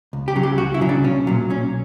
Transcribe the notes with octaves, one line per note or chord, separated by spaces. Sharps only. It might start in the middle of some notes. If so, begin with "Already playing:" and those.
C#2
G4
C#3 F#3
G4
C#2 F#4
E4
C#3 F#3
D4
B1 C#4
A#2 F#3
B1 C#4